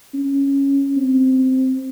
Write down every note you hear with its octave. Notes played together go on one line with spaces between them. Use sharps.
C#4
C4